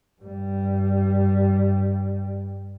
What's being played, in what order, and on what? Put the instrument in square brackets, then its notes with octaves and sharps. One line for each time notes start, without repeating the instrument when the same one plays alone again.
[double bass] G2 G3